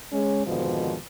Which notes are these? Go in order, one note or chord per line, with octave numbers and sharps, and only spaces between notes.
G#3 C#4
F2 G#2 B2 D3 D#3 F3